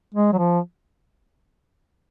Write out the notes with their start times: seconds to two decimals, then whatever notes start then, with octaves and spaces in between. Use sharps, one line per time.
0.14 G#3
0.32 F#3
0.38 F3